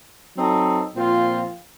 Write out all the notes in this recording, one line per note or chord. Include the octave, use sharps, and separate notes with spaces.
F#3 C4 D#4 A4
A#2 F3 C4 F4